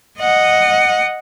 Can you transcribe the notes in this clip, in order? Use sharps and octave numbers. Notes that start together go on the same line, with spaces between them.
D#5 F#5